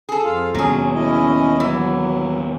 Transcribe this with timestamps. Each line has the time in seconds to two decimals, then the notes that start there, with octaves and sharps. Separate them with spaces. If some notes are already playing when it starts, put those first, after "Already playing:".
0.09 G#4 A4
0.25 F2 F4 F5
0.55 D#2 B2 F#3 C#4 G#4
0.95 C#4 E4 D#5
1.60 E3 F#3